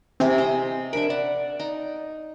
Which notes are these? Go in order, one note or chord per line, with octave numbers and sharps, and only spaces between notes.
C3 E3 C4 G#4
C5 D#5
D4 A#4 E5 B5
D5 F#5
D#4